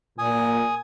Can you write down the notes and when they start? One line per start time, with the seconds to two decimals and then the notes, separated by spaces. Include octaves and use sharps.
0.19 A#2 G#5 D#6